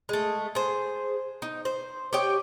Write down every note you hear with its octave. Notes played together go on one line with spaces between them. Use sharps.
G#3 A3
G#4 C5
D#4
C5
G4 C#5 D#5 G5